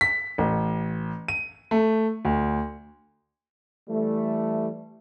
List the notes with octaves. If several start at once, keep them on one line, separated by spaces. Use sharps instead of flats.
B6
A1
D#7
A3
D2
E3 G3 A3